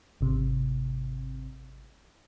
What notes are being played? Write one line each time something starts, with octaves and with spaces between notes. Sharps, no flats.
G#1 C3